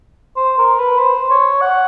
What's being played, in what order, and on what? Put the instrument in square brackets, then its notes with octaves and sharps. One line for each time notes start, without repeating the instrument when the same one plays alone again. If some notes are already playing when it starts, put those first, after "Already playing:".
[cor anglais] C5
A#4
B4
C5
C#5
F#5